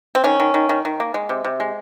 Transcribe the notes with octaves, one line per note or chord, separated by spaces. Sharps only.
C4
D#3 C#4
D#3
D#3
D#3
D#3
A#3
G#3
C3
C3
G#3